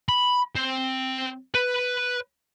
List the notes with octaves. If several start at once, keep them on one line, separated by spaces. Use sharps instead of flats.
B5
C4
B4